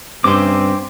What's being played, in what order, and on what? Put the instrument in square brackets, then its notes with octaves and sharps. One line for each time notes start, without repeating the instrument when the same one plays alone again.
[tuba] G2 [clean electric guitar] C4 C#4 G4 [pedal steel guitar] C6 D6